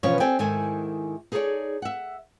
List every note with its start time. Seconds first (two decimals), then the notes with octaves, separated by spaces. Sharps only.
0.03 B2 E3 F3 B3 C#4 C#5
0.20 C4 G4 A4 D5 G5 G#5
0.39 G#2 D#3 E4 A4 G#5
1.32 D#4 G#4 A4 B4 C#5 D5
1.82 E5 F#5